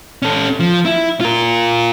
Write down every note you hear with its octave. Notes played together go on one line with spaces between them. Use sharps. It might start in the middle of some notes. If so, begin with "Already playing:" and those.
C#4 A4
F3
E4
F4 A#4